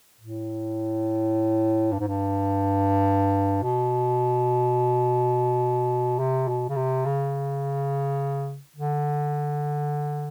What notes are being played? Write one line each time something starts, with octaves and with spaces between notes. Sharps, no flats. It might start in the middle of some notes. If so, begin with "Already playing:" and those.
A2
G2
G#2
G2
B2
C3
B2
C#3
C3
C#3
D3